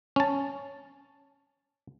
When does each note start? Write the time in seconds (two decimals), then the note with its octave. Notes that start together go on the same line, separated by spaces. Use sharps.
0.16 C#4 A5